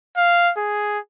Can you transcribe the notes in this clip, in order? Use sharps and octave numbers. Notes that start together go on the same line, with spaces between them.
F5
G#4